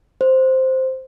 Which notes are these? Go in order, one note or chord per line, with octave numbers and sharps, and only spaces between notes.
C5